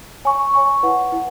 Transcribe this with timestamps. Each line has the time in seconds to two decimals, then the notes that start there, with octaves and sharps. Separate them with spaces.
0.25 C#5 G#5 C#6
0.54 C#5 G#5 C#6
0.83 E4 B4 F#5
1.12 E4 B4